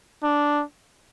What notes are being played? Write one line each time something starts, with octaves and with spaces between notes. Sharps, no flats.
D4